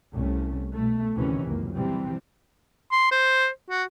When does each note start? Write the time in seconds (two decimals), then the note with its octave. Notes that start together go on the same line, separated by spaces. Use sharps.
0.13 C2 A3 C#4
0.74 B2 A3
1.14 D2 A2 C3 D#3 E3 C#4
1.45 C#2 F#2 A#3
1.75 C3 E3 G3 C4
2.92 C6
3.11 C5
3.70 F#4